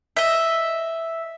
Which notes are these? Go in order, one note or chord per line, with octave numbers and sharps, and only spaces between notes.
D#5 E5